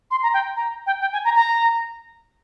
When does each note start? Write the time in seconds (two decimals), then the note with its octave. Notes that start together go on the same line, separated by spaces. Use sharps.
0.11 C6
0.23 A#5
0.34 G5
0.56 A#5
0.86 G5
1.01 G5
1.13 G#5
1.24 A#5
1.35 A#5